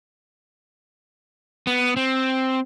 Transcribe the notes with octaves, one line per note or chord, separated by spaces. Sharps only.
B3
C4